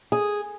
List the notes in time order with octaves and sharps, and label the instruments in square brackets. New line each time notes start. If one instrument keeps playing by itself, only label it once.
[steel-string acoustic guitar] G#4